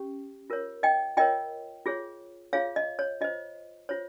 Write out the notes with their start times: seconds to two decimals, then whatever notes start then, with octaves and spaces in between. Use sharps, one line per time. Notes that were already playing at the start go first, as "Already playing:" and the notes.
Already playing: C#4 G4
0.50 F4 A#4 C#5
0.83 D#5 G5
1.17 F4 A#4 C#5 D#5 G5
1.86 F4 G#4 C#5
2.53 F4 G#4 C#5 F5
2.76 D#5
2.99 C#5
3.21 F4 C5 D#5
3.89 F4 C5 C#5